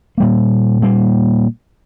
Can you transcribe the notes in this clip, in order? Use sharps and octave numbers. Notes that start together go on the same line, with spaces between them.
A#2 G3 A#3
A#2 G3 A#3